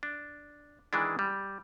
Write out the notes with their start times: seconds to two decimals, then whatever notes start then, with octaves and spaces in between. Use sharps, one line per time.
0.03 D4
0.93 D#3 E3 G#3 D4
1.19 G3